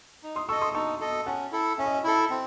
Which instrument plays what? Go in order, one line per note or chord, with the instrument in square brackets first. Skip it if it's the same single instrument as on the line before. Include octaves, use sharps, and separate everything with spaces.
[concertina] D#4
[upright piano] C6 D#6
[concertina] A4 D#5 [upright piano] C#6 E6
[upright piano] C6 D#6
[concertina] D#4 [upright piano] A5 C#6
[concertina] A4 D#5
[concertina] C#4 [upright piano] F#5 A5
[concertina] E4 A4
[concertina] C#4 [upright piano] E5
[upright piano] D#5
E5
[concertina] E4 A4
C4